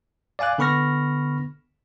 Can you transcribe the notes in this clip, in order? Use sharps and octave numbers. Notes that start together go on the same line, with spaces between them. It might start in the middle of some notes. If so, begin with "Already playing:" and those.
D5 F5 G#5 D6 F#6
D3 B3 B5 C#6 F6 A#6